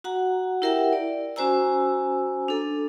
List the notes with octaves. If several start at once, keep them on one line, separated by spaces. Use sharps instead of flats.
F#4 F#5 A#5
E4 G4 A#4 E5 F#5 G5
D5
C#4 F#4 C5 G#5 A#5 E6
D4 A4